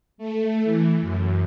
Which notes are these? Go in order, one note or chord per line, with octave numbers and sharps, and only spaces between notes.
A3
E3
F#2